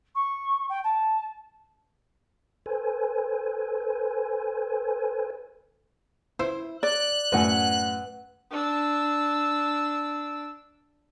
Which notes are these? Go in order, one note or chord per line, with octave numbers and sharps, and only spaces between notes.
C#6
G5
A5
A4 B4 C5 G#5
E4 C5
D5 F#6
F#2 A2 B4 F#5 G#5
D4 E6